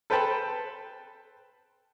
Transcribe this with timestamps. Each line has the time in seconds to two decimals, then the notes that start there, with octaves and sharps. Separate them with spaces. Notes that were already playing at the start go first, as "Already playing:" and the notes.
0.10 A4 B4 C5 G5 A5 B5